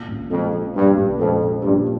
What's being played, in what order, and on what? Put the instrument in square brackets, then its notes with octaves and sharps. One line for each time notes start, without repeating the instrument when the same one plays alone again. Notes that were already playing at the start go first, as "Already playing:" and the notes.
Already playing: [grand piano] A#2
A#1
[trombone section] F2 [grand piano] G#3
[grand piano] F3
[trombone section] G2 [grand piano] A#2
[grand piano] A#1
[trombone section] F2 [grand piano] G#3
[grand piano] F3
[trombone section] G2 [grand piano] A#2